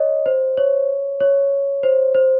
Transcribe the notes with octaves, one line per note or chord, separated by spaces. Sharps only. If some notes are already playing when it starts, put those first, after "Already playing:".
Already playing: C#5 D#5
C5
C#5
C#5
C5
C5